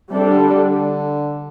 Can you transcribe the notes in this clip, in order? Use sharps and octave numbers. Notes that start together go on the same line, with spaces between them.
C3 G3 D4 A4
D3
D3